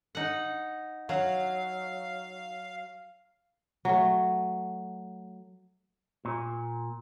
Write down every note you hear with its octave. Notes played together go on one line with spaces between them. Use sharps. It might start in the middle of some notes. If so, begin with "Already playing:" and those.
D#4 F#5
F#3 F5
F#3 A3
A#2